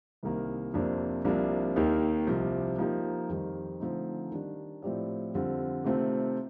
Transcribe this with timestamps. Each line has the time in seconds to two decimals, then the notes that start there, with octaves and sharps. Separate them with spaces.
0.23 C2 C3 D#3 A#3
0.74 F2 C3 F3 A#3 D4
1.24 C2 C3 F3 A#3 D4
1.76 D#2 D#3 A#3 D#4 G4
2.27 C2 C3 F3
2.78 F3 A#3 D#4 G4
3.29 F2 D#3 G3
3.80 D3 F3 A3 C4 D#4
4.32 D#3 G3 D4
4.82 A2 F3 C4 G4 D5
5.34 F2 D3 G3 C4 F4
5.84 C3 D#3 A3 C4 F4